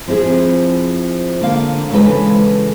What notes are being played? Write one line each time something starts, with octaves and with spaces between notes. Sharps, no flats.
F3 C4 E4 G#4
D3 A#3 F5
C#3 E3 G#3 A4 B4